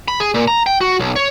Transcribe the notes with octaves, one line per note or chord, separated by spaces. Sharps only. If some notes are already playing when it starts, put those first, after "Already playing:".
B5
G#4
A#2
A#5
G5
F#4
B1
C#5